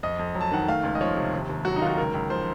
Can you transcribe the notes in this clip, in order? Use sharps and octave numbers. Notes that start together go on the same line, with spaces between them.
F2 D#5
F2
F#3
A5
D#3 F#5
A3 F5
C#2
D#5
F3 C#5
C3
D#2
D#2
F#3 F#4
D#4
D#3 F4
F#4
C#2 A#4
C#2
F3 C5